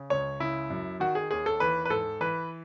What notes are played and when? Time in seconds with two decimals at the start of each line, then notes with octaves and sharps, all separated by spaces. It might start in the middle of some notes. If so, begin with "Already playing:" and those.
Already playing: C#3
0.10 C#2 C#5
0.40 C#3 E4
0.70 F#2
1.00 D#3 F#4
1.15 G#4
1.31 D#2 G#4
1.46 A4
1.60 E3 B4
1.85 B4
1.90 G#2 A4
2.21 E3 B4